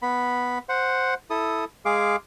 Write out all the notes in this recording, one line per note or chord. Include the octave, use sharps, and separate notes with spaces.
B3 B5
C5 F#5
E4 A4 D#6
G#3 G#4 F5 D6